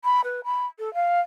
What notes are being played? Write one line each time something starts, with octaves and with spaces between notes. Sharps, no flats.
B5
B4
B5
A4
F5